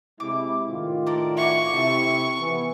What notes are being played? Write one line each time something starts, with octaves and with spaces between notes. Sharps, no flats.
C3 G#3 E4 D6
A2 D#3 F4
A4 A#4 D5
E4 F#4 C#6 D6
C3 E4 A4 E5
E3 B3